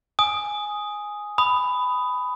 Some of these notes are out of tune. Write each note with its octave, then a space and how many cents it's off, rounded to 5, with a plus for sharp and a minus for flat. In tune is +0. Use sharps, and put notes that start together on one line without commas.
G#5 +0 D#6 +0
B5 +15 D#6 +0